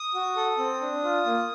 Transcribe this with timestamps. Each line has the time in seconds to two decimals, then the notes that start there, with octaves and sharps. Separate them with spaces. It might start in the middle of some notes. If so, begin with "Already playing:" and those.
Already playing: D#6
0.14 F#4
0.36 A4
0.58 C4
0.81 D4
1.04 F4
1.26 A#3